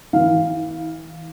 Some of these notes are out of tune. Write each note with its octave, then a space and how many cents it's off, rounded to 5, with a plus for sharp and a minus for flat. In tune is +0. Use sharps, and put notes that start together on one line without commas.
E3 -35 F5 +0